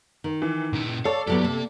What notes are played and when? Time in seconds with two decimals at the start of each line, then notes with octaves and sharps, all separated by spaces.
0.24 D#3
0.42 E3
0.73 C#2 A#2 E4
1.05 A4 C#5 D5 F5
1.27 A2 F#3 B3 G4
1.44 C3 A#3